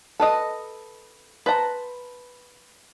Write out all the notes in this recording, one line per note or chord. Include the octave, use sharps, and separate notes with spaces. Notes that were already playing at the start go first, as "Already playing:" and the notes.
A4 B4 D#5
B4 C5 A5 A#5